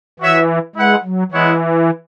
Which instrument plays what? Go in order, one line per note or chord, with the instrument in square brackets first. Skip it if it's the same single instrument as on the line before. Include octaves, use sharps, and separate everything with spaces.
[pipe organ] E3 [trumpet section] F#4 C#5 E5
[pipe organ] G#3 [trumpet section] E4 B4 F#5
[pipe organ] F#3
[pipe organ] E3 [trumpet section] G#3 B3 E4 C#5 F#5